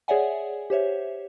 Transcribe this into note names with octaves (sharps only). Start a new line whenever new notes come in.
G#4 C#5 D5 E5 F#5 G#5
G4 C5 C#5 E5